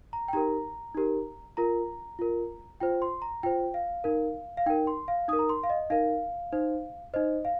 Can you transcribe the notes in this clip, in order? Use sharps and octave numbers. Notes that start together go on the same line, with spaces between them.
A#5
G5
D#4 G4 A#4 A#5
D#4 G4 A#4
F4 A#4 A#5
F4 A#4
F4 C5 G5
C6
A#5
F4 C5 G5
F5
D#4 A#4
F5
D#4 A#4 G5
C6
F5
D#4 A#4 D#6
A#5
C6
F5
D#5
D#4 A#4 F5
D#4 C5
D#4 C5 D#5
F5